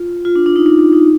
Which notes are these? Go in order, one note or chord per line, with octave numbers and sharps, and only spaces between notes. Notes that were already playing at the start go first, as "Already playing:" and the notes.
Already playing: F4
F4
D4
D4
D#4
D4
D4
D#4